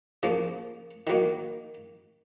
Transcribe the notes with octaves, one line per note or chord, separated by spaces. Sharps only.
C#3 F3 A#3
D#3 F#3 A#3